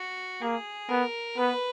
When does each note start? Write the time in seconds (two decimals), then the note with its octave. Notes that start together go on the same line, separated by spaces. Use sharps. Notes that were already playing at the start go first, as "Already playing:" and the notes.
Already playing: F#4
0.42 A#3 G#4
0.89 B3 A#4
1.37 B3 B4